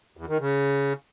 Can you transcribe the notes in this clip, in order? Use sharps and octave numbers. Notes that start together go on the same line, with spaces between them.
E2
D#3
C#3